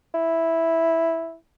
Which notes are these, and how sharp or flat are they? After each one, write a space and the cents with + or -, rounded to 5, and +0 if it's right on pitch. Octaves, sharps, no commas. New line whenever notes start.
E4 -5